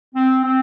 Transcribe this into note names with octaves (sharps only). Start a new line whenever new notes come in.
C4
C4